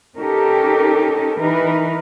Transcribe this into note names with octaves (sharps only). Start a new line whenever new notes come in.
C#4 D#4 G4 A4 A#4
E3 D#4 A#4 B4